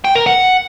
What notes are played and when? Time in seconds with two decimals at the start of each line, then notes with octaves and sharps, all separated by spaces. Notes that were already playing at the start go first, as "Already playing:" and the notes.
0.04 G5
0.15 A#4
0.26 F#5